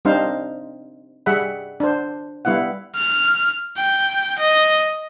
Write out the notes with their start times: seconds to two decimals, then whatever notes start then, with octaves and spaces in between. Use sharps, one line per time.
0.05 G3 C4 D4 D#4 C5 F5
1.26 G3 G#4 E5 F#5 B5
1.80 D4 C5
2.45 G3 B3 E4 F5 F#5
2.95 F6
3.77 G5
4.39 D#5